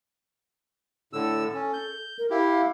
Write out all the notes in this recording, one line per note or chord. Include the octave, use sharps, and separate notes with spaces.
A2 D3 A4 E6
C#4
G6
A#4
E4 G4 F5